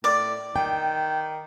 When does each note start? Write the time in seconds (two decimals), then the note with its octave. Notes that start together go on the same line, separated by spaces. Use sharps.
0.04 A2 D5 D6
0.56 D#3 G5